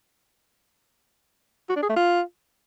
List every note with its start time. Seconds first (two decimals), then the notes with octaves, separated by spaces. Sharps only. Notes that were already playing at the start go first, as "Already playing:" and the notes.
1.69 F#4
1.76 D4
1.83 G#4
1.89 A3
1.96 F4